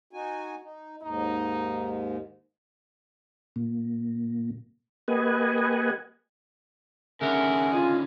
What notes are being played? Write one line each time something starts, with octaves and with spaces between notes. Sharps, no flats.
D#4 F#4 G#5
D#4
D#2 G#2 D#4
A#2
A#3 G4 B4 D#5 F#5 G#5
D3 D#3 C#4 G#4 A#4 E5 F#5
F4 D#5 G#5